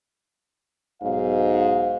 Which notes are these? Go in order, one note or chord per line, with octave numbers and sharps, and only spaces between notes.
B1 G#2 F5